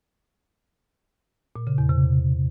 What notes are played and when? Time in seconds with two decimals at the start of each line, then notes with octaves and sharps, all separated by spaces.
1.56 A#2
1.67 C#3
1.78 E2
1.89 C3